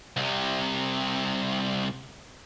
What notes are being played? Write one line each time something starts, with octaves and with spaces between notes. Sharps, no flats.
C2 C3